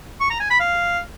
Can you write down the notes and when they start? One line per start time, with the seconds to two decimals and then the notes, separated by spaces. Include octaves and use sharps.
0.20 C#6
0.30 A#5
0.40 G#5
0.50 B5
0.60 F5